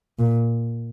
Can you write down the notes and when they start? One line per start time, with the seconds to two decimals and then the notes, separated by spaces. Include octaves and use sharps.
0.19 A#2